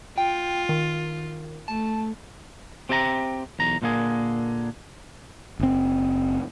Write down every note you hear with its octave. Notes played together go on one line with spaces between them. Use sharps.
F4 G5
D#3
A3 A5
C4 G4 E5 A5 A#5
B1 E2 A#5
A#2 D3 A#3 G#4
F#1 C4